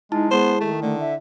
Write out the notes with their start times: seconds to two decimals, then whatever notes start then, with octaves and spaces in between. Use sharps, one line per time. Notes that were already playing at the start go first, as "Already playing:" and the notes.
0.12 G#3 D#4 E4 A5
0.31 G#3 B3 C5
0.61 D#3 A3
0.83 D3 A3
1.00 E5